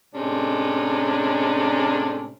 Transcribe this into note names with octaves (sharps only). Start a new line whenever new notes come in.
A2 C3 G#3 C#4 D4